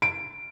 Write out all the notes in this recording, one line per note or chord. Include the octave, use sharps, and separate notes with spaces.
D7